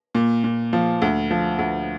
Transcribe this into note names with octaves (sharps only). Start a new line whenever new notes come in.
A#2
A#2
F3
D2
F3
D2